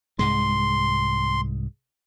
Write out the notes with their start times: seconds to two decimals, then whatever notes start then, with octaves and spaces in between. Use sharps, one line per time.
0.19 C2 G#2 G#3 C6